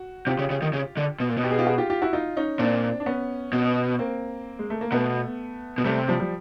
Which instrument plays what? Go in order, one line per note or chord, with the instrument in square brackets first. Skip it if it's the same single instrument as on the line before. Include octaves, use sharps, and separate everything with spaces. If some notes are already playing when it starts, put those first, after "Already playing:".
Already playing: [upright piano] F#4
[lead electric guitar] C3 [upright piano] F4 G4
[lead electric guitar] C#3
C#3
D#3
C#3
D3
B2
A#2
B2
[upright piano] G4
G#4
F4 G4
F#4 G#4
F4 G4
F4 G4
E4 F#4
D#4 F4
C#4 D#4
[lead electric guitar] A#2 [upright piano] C4 D4
[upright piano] D4
B3 C#4
[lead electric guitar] B2
[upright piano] A#3 C4
G#3
A3
A#3
[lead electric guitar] B2 [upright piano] A3 B3
[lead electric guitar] B2
[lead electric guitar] C3 [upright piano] G3 A3
[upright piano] F3 G3
F3 G3